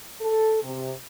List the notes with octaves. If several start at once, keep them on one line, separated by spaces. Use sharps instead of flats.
A4
C3